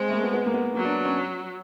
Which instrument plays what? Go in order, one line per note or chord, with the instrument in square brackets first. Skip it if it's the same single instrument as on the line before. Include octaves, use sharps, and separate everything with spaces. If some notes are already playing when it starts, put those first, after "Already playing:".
Already playing: [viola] G#3 [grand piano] C4
[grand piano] A3
A#3
B3
B3
A#3
B3
[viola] F#3 [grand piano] A#3
[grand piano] D4
C#4